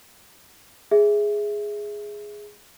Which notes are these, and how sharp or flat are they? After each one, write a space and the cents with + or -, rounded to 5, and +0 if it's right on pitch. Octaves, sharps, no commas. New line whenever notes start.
G#4 +0 E5 +0